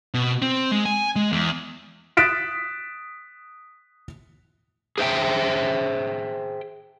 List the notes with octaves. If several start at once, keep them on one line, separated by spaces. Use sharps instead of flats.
B2
C4
G#3
G#5
G#3
E2
D#6 F#6 A6 B6 D7 E7
G#4 C5 E5 G5